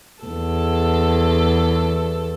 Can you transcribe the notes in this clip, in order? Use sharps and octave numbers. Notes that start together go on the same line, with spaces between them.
E2 A4